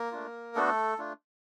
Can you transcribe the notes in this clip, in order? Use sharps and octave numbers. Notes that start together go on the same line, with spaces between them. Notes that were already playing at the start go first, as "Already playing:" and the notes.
Already playing: A#3 A#4
A3 D4 F4
A3 B3 D4 F#4 A4
A3 D4 F4